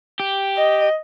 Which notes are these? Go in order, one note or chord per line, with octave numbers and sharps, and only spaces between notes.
G4
D#5